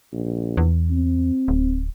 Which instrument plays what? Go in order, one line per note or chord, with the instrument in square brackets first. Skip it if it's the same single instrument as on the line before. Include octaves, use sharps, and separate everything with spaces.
[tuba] A#1
[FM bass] E2
[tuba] C4
[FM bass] D1